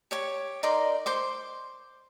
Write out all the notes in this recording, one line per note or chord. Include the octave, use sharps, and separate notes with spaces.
G4 C#5 C#6
D#4 A#4 D5 C6
C5 C6 D6